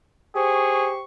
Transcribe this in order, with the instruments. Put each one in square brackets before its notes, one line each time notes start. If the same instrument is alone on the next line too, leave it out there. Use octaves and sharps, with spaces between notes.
[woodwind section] G4 C5 C#6 [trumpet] G#4